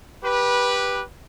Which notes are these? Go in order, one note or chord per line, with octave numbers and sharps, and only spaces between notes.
G4 B4